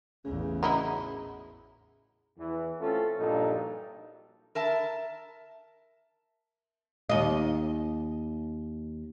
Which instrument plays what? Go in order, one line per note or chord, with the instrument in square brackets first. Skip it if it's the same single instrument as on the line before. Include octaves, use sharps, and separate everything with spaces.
[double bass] A1 E2 [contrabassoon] C#3 [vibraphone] G#4
[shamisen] F#3 D#4 E4
[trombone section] E2 E3
A3 C4 C#4 F4 A4
A#1 G2 A#2 F#3 D#4 A4
[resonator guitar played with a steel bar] A#4 E5 A5
[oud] D#2 D#5